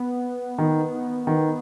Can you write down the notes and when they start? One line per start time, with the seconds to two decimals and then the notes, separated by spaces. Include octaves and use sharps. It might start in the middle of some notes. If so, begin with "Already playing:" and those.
Already playing: B3
0.58 D#3
1.27 D#3